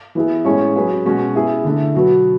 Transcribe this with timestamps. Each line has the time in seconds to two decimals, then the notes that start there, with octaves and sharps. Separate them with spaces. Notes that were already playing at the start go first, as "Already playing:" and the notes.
0.15 E3 B3 E4 G#4
0.45 A2 G#3 C#4 G#4 C#5
0.75 F#3 C#4 G#4 B4
1.06 B2 G#3 C#4 F#4 C#5
1.35 B3 E4 G#4
1.65 D3 A3 E4
1.95 B2 F#3 B3 F#4